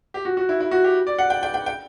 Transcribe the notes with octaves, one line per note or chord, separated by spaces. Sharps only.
G4
F#4
F#4
E4
E4
F#4
G4
D5
F#5
G5
G5
G5
G5